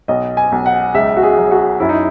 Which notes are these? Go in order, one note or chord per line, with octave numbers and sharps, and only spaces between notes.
B1 D#5
G#5
B1
F#5
C#2 E5
F#4
G#4
F#3
F#4
F#2 E4
D#4